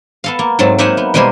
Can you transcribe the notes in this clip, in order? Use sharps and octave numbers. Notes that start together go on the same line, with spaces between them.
B3 A4 F5
A#3
G#2 F#3 A3 C4 A5
A#3 D#4 C5 E5 F#5 G#5
B3
B2 G3 G#3 A#3 C5 G#5